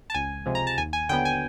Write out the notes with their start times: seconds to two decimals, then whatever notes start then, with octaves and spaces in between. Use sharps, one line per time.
0.10 A5
0.14 C#2 G#5
0.46 C3 F3 G#3
0.55 A#5
0.67 A5
0.78 D#2 G#5
0.93 G#5
1.09 D3 F#3 B3 G5
1.25 G#5